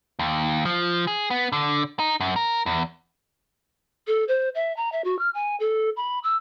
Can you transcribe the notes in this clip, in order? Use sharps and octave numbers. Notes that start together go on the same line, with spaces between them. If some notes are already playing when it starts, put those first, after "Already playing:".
D#2
F3
G#4
B3
D3
D#4
F#2
A#4
E2
A4
C5
E5
A#5
E5
F#4
F6
G#5
A4
B5
E6